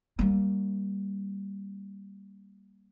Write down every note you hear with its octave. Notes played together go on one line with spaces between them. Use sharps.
G3 A#3